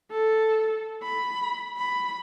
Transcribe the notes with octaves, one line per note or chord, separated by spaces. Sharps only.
A4
B5
B5